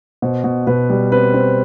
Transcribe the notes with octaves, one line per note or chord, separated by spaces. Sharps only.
B2 C5
B2
B2 B4
G3
C4 B4
C4